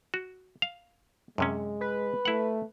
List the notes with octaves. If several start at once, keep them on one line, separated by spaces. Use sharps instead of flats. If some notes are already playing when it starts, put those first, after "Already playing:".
F#4
F5
F#2 C3 G#3 C#4
B4
A3 E4 F#5